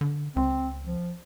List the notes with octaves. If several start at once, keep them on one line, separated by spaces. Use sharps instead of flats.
D3
C#2 C4
F3